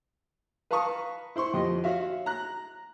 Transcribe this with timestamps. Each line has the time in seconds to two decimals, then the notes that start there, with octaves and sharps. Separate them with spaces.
0.71 B4 F5 A5 A#5 C#6 D#6
1.36 E4 C5 C6 C#6
1.54 F2 G4 C5 D#5
1.84 F#4 C#5 E5 F5
2.26 A#5 F#6